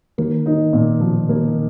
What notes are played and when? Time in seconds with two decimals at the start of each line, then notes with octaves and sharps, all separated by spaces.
0.18 D#3 A#3
0.46 D#4
0.73 A#2
1.00 F3
1.29 A#3